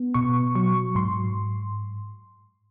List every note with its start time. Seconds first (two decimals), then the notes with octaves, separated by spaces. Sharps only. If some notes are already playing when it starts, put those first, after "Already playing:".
Already playing: B3
0.14 B2 C#6
0.55 F#3 C#6
0.95 G#2 C6